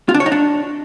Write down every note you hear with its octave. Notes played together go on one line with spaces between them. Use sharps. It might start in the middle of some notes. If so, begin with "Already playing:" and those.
F4
D4
C#5
D#4
D4